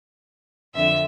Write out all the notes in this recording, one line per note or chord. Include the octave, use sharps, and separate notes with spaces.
F2 D3 F3 E5